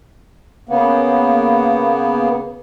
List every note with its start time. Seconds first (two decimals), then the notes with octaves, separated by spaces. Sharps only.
0.69 C#3 A#3 B3